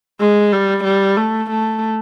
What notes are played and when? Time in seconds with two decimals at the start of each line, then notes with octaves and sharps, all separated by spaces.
0.20 G#3
0.52 G3
0.84 G3
1.17 A3
1.50 A3